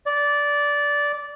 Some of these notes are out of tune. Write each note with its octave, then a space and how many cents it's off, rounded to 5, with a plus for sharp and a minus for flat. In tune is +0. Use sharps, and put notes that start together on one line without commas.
D5 -15